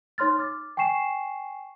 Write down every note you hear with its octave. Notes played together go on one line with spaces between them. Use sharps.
D#4 C#5 C6 F6 A6
D6 F6 A6
G5 G#5 C#6 C7 E7